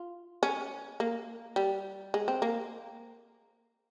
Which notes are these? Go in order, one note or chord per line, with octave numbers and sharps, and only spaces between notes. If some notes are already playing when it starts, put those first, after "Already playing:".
Already playing: F4
C#4
A#3
G3
G#3
C4
A#3